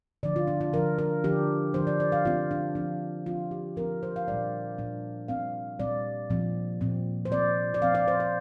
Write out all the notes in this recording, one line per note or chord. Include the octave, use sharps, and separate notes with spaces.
D3 F3 D4 D5
F4
D4
F4
D3 F3 D4 A#4
A#4
D3 F3 D4 G4
D3 F3 D4 C5
D5
D5
F5
F3 C4 F4
D4
F3 C4 D4
F3 C4 F4
G4
F3 C4 A#4
C5
F5
A#2 G3 D4 D5
A#2 G3 D4
A#2 G3 C4 F5
A#2 G3 C4 D5
A#2 F3 C4
A#2 F3 C4
C5
F3 C4 D5
D5
F3 C4 F5
D5
C5
C5